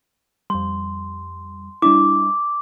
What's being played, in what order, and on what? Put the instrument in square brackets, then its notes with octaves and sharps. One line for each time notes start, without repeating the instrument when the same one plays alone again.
[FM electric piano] F2 G3 [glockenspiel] C6
[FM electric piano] G3 D4 E4 [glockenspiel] D6